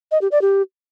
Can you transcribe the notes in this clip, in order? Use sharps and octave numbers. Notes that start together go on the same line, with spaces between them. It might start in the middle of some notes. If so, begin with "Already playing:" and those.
D#5
G4
D5
G4